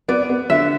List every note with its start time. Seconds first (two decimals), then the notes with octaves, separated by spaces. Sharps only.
0.08 B3 D5
0.29 B3
0.50 D3 E5